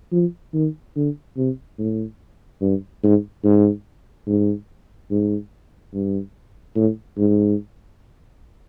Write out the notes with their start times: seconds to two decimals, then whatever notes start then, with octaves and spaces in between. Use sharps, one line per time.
0.12 F3
0.54 D#3
0.96 D3
1.37 C3
1.78 A2
2.61 G2
3.03 G#2
3.44 G#2
4.27 G#2
5.11 G#2
5.94 G2
6.76 A2
7.18 G#2